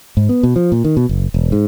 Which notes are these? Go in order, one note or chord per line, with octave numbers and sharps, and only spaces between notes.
G#2
B3
B2
F3
A#2
D#3
B2
F#1
E1
G#2